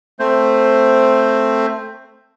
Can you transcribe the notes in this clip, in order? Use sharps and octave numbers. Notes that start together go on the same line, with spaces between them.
A3 C4 C5